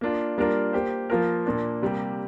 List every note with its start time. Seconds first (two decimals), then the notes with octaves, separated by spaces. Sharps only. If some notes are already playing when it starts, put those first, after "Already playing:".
0.01 A#3 D4 F4
0.38 G3 A#3 D4 F4 A#4
0.73 A#3 G4 C5
1.10 F3 A#3 F4 A#4
1.46 A#2 A#3 D4
1.82 C3 G3 A#3 G4